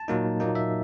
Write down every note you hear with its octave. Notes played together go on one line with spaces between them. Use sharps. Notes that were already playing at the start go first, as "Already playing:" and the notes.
Already playing: A5
A#2 F#3 A#3 D#4
A#2 F#3 A#3 D#4
E5